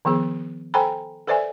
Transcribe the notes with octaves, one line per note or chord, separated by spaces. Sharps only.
D#3 F3 B3 G#4
A4 C5 G5 G#5 A#5 B5
A4 B4 C5 D5 E5 G#5